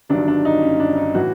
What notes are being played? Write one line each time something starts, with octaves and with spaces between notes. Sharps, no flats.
G1 G2 D#3 F#3 D4
D4
D#4
C#4
D4
D#4
A2 E3 F#4